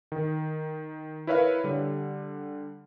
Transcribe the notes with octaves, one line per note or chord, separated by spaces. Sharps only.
D#3
E4 A#4 B4 C#5 E5 F5
D3 G3